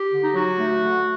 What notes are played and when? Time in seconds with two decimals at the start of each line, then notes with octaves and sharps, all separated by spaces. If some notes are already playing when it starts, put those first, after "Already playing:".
Already playing: G4
0.11 D3
0.21 D#4
0.33 F#3 F#4
0.58 A3
0.81 D3